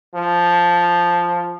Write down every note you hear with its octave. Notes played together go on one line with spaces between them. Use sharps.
F3